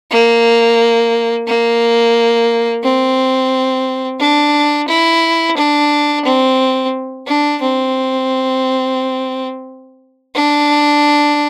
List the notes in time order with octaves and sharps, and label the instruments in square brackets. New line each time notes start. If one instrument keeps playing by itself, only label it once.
[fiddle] A#3
A#3
C4
D4
E4
D4
C4
D4
C4
D4